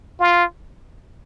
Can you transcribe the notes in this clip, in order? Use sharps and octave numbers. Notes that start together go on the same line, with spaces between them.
F4